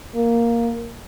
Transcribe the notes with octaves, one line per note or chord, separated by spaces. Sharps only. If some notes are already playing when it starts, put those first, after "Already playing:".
A#3